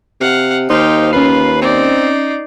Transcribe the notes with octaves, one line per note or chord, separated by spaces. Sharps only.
C3 F5 F#5
D#2 D#4 G4 C5 F5
C#4 F4 B4 C7
C4 D#4 D5